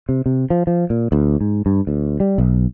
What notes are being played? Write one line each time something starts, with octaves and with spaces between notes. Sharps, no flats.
C3
C3
F3
F3
A#2
D2
G#2
G2
D2
G3
B1